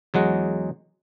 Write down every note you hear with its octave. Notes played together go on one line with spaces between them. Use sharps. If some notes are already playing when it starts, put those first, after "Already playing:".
E2 F#3 G#3 F#5